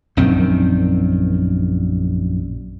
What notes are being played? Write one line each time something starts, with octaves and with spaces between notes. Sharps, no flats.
A#1 F#2 D#3 C4